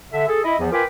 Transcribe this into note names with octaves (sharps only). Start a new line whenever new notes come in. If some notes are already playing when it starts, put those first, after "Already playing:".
D3 E5
G#4 A4
E4 D#5
E2 E3 F3
F4 A#4 B4 G5 G#5 D6